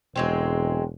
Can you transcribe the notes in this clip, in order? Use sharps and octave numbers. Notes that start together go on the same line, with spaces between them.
E1 F#3 G#3 C4